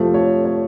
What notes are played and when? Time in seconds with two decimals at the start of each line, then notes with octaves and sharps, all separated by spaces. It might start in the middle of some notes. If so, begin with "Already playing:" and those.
Already playing: F2 C3 F3 A3
0.14 C#5
0.45 C#5